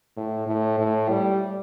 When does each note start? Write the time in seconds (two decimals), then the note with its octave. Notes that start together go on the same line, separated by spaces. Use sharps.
0.16 A2
0.47 A2
0.78 A2
1.09 G3